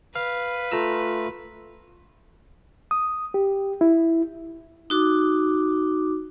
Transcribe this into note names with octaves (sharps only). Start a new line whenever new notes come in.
B4 F5
A3 F4 A#5 E6
D#6
G4
E4
D#4 F#4 D6